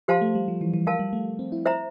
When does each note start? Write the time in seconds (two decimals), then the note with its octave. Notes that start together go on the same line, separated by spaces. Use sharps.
0.08 F3 G4 C5 F5 A5 C6
0.21 A3
0.35 G3
0.48 F3
0.61 E3
0.74 E3
0.87 F3 A#4 F5 A5
0.99 G3
1.13 A3
1.39 C4
1.52 E4
1.66 C5 E5 A#5